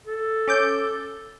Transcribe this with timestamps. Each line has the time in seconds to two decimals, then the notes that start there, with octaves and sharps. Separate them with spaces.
0.07 A4
0.48 C#4 D6 G6